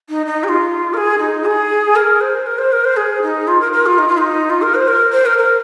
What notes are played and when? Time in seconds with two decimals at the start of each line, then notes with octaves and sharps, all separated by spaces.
0.10 D#4
0.26 D#4
0.44 G#4
0.49 F4
0.94 A#4
0.97 G#4
1.19 D#4
1.45 G#4
1.96 A#4
2.21 C5
2.46 A#4
2.58 C5
2.72 A#4
2.84 C5
2.97 G#4
3.22 D#4
3.48 F4
3.61 A#4
3.73 A#4
3.86 F4
3.98 D#4
4.08 F4
4.18 D#4
4.50 F4
4.62 A#4
4.75 C5
4.88 A#4
5.13 C5
5.26 A#4
5.38 A#4